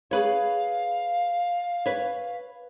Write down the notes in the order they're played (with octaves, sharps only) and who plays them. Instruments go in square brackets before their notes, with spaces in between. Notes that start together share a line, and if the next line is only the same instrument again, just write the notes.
[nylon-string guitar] G#4 B4 C#5 [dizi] F5
[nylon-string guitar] B4 C#5